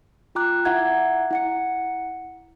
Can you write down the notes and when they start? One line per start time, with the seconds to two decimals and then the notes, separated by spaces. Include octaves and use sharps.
0.35 F4 G5 A#5 D6 F#6
0.65 E4 E5 F#5 A#5 G#6
1.31 E4 F#5 C#7